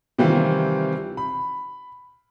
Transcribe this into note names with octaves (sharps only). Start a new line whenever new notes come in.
C3 D#3 E3 G3 C4 F4
B5